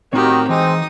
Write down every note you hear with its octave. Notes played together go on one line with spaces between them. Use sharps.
A2 D#3 C4 F#4 G4 C#5
E3 G#3 C4 D#4 D#6